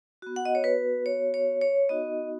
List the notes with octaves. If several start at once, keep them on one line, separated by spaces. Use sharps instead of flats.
B3 F#4
F#5
D#5
C#5
B4
C#5
C#5
C#5
B3 D#4 F#4 D#5